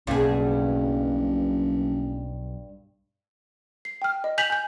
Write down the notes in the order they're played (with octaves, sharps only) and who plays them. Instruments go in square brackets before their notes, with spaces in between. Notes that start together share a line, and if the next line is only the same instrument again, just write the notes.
[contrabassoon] F#1 [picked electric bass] B1 B2 [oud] G2 G#4
[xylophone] C7
G5 F6
D#5
G#5 G6 B6 F7 F#7
G#5 G6